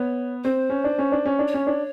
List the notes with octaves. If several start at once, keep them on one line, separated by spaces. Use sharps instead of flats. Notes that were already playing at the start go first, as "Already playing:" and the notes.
Already playing: B3 C#5
C4 C5
C#4
D4
C#4
D4
C#4
D4
C#5
C#4
D4